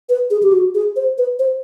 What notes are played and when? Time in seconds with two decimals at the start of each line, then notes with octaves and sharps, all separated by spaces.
0.09 B4
0.30 G#4
0.43 G4
0.53 F#4
0.75 G#4
0.96 C5
1.18 B4
1.39 C5